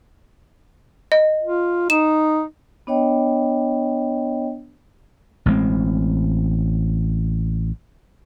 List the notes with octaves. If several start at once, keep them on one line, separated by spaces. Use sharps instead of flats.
D#5
F4
D#4 E7
B3 D4 C#5 D#5 G5
A1 G#3 B3 C4